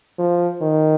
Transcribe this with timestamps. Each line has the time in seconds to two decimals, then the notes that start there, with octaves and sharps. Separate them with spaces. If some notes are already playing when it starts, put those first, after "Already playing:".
0.19 F3
0.62 D#3